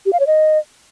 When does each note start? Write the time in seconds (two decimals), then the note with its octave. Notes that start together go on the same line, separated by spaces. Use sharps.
0.06 G4
0.13 F5
0.20 C#5
0.27 D#5